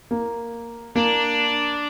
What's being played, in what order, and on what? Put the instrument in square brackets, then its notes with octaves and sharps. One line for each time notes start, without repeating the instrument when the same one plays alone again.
[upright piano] A#3
[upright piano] A#3 [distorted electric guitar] D4